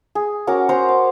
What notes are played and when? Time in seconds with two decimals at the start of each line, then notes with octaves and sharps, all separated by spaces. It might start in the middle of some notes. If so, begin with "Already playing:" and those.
0.15 G#4
0.47 C#4 F#4 A#4 D6
0.69 C5 F#5 A#5 C6
0.89 D6